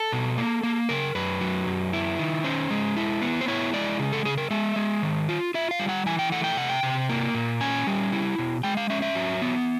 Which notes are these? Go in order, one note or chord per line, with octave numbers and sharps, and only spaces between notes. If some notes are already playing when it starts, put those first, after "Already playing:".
Already playing: A4
B2
A#3
A#3
C#3 A#4
F#2 B4
F#3
F#2
E4
D#3
C#4 C5
G#3
E4
B3
C5
E4 C#5
G#3 D5
C#3
A4
C#3 G#4
A#4
G#3 E5
G#3
D#3
F4
F4 E5
F5
G3
F#5
E3 G#5
G5
A3 F#5
G5
C3 F#5
G5
C3
A#3
A#2
C#4 G#5
G3
E4
B2
G#3 G5
F5
C#4 E5
E5
F#3
B3